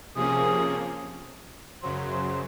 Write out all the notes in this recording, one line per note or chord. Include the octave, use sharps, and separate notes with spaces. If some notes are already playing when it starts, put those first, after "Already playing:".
C3 F3 A#3 C#4 G#4
F#2 C#3 F#3 C5
C5
C5